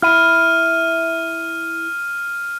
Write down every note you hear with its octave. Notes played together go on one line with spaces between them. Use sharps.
E4 F6 D#7